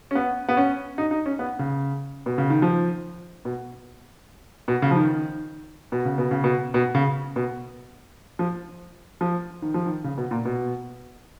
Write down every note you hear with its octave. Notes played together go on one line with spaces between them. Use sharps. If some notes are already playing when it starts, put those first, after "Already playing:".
C#4
B3
B3
C#4
D#4
D#4
C#4
B3
C#3
B2
C#3
D#3
F3
B2
B2
C#3
F3
D#3
B2
C#3
B2
C#3
B2
B2
C#3
B2
F3
F3
D#3
F3
D#3
C#3
B2
A#2
B2